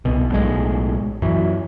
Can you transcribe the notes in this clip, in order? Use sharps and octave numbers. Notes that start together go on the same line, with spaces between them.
C2 B2
B1 A2 G#3
F#2 E3